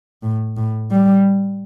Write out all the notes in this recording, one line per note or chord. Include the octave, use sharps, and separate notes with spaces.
A2
A2
G3